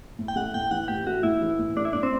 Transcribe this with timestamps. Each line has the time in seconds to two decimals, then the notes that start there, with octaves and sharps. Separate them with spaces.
0.19 A2
0.28 G5
0.36 A3 F#5
0.54 A2 G5
0.71 E3 F#5
0.88 A2 G4
1.06 A3 F#4
1.23 A2 E4
1.41 E3
1.59 A2
1.76 A3 D4
1.85 E4
1.93 A2 D4
2.03 C4